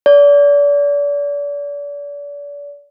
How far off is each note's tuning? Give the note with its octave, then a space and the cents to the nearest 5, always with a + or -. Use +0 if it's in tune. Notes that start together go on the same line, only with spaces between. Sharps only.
D5 -35